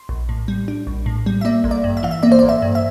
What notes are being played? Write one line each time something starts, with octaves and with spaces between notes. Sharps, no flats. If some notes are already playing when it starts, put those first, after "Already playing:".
Already playing: C6
A#1
A2
G3
D4
A#1
A2
G3
E5
A#3 D5
A1
D5
G2
E5
E3 F5
E5
A#3 D5
C5
D5
A1
E5
G2
E5